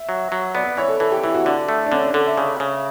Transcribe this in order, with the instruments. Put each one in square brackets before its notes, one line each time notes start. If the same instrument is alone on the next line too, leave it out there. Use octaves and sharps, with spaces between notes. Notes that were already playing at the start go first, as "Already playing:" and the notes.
Already playing: [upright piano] E5
[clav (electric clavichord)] F#3
F#3
[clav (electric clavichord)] B3 [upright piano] D5
[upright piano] D5
[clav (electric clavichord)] E3 [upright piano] C#5
[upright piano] A4
[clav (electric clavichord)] E3 [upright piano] A4
[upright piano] G4
[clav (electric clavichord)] E3 [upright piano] E4
[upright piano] F#4
[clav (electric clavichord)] D3 [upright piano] D4
[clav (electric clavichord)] A3
[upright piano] D4
[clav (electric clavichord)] D3 [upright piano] C#4
[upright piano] D4
[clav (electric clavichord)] D3 [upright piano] A4
[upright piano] E5
[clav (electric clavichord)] C#3
C#3